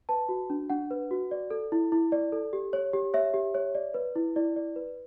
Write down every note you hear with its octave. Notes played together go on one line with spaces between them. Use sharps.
B4 A5
F#4
D4
D4 F#5
B4
F#4
D5
A4
E4
E4
D5
A4
G4
C#5
G4
C#5 E5
G4
C#5
D5
B4
E4
E4 D5
D5
B4